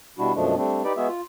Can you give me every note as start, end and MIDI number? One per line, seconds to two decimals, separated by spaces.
0.19 0.33 47
0.19 0.33 55
0.19 0.33 62
0.19 0.33 64
0.19 0.33 66
0.35 0.56 42
0.35 0.56 47
0.35 0.56 53
0.35 0.56 56
0.35 0.56 57
0.35 0.56 62
0.56 0.82 55
0.56 0.82 57
0.56 0.82 60
0.56 0.82 62
0.84 0.93 63
0.84 0.93 67
0.84 0.93 71
0.84 0.93 74
0.97 1.08 56
0.97 1.08 59
0.97 1.08 66
0.97 1.08 68
0.97 1.08 76
1.08 1.21 65